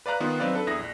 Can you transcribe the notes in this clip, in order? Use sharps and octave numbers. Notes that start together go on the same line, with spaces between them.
B4 D5 F5 A#5 F#6
D#3 B3 F4
F#3 C4 D#4 B4 D5 F5
D4 A4 B4
E2 E4 D#6 A#6
A#1